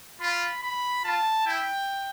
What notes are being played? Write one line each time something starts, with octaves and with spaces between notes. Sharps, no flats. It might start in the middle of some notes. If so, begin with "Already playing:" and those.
F4 B5
B5
F4 A5
E4 G5